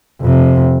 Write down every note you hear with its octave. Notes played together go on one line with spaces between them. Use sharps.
F2 C3